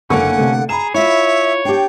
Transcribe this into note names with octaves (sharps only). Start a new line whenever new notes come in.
F#1 D3 A#3 C#4 A4 F#5 C#6
C3 A3
G#4 A#5 B5 E7
E4 F4 C#5 E5
D4 G4 G5